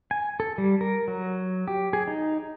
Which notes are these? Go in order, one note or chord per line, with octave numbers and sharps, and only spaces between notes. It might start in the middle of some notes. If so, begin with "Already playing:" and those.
G#5
A4
G3
A#4
F#3
G4
G#4
D#4